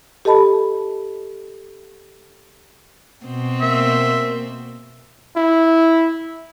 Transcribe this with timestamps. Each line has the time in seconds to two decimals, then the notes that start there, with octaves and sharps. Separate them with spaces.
0.25 G4 A4 D#5 A5 B5
3.26 B2 C4
3.61 A#3 E5
5.36 E4